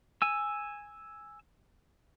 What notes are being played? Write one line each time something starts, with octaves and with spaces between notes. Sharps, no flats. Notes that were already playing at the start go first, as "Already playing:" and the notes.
G#5 E6